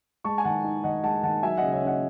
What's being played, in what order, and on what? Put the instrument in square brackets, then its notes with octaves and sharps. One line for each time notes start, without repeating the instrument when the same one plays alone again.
[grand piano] G#3 A5 C#6
G#5
D#3 F#5 A5
D#4
D#3 D#5 F#5
G#3 F#5 A5
D#3 F#5 A5
F#3 E5 G#5
C#3 D#5 F#5
C#5 E5
C#4
D#5 F#5